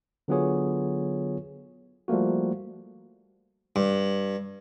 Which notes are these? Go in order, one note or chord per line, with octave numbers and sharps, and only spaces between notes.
D3 F#3 B3 F4 G#4 C#5
F3 G3 A3 A#3 F#4
G2